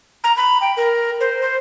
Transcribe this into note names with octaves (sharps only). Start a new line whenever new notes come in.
A#5
B5
G5
A#4
C5
C5